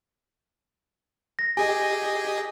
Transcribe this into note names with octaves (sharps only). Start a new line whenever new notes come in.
A#6
G4 G#4 D#5 G#5